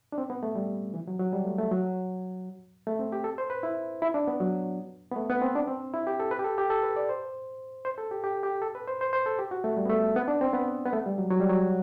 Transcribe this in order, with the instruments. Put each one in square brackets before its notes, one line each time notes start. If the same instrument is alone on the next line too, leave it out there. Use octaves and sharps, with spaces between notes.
[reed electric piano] D4
C4
B3
A3
G3
E3
F#3
F#3
G3
A3
A3
F#3
A3
C4
G4
A4
C5
B4
E4
E4
D4
B3
F#3
B3
A3
B3
C4
D4
C4
E4
G4
A4
B4
G4
A4
G4
A4
B4
D5
C5
C5
A4
G4
G4
G4
A4
B4
C5
C5
C5
A4
G4
F#4
A3
G3
B3
A3
B3
D4
C4
B3
B3
A3
G3
F#3
F#3
G3
F#3